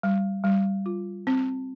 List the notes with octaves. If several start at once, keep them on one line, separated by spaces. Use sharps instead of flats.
G3
G3
F4
C4